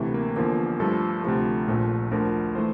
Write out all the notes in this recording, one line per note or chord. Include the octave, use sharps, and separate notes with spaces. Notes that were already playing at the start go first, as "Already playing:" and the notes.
Already playing: D2 C3 E3 A3
A#3
E2 D3 F3 A#3
G2 F3 A3 A4
D2 C3 F3 A3 A4
A#1 A#2 F3 A3
D2 D3 F3 A3 A#4
E3 A3 C5